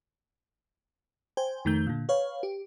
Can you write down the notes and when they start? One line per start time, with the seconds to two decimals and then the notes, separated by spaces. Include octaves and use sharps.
1.37 C5 G5 G#5
1.65 F2 D#3 A3 G6
1.87 A#2 D3
2.09 B4 C#5 F5
2.43 G4